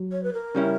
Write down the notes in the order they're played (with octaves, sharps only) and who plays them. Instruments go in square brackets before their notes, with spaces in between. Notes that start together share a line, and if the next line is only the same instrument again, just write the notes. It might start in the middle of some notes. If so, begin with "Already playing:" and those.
Already playing: [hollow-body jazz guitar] F#3
[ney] C#5
B4
A#4
[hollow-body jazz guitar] C#3 G3 C#4 E4